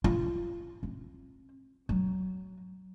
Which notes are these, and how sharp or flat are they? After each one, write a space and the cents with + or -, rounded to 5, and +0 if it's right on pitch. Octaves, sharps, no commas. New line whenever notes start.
F4 -25
C4 +40
F#3 +15